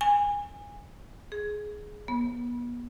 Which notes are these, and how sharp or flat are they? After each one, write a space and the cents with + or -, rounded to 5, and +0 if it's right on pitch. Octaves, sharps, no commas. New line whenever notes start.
G#5 -20
G#4 +10
B3 -40